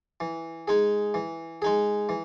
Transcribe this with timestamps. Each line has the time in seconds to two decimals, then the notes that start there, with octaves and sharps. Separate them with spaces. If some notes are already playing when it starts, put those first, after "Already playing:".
0.20 E3
0.68 G#3 D#4 G#4
1.14 E3
1.62 G#3 D#4 G#4
2.09 E3